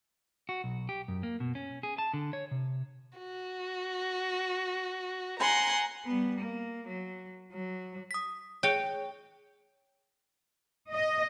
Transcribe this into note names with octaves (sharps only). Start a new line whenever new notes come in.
F#4
B1
G4
F#2
A#3
B2
C#4
G#4
A5
D3
C#5
C3
F#4
F#5 G#5 A#5 C6
G3 B3
A#3
F#3
F#3
D#6 B6
G#4 C#5 G5
D#5